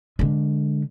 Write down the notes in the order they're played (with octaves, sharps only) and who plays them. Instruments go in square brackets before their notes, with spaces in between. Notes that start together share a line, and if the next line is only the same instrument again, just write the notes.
[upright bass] D3 G#3